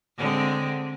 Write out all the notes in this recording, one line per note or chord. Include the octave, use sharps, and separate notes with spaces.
D3 G#3 C4